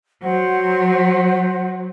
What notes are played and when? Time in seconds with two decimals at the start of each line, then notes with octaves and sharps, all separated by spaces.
0.23 F#3 C5 F#5